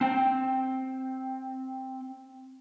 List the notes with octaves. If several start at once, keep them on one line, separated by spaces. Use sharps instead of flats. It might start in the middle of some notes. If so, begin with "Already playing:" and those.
C4 G5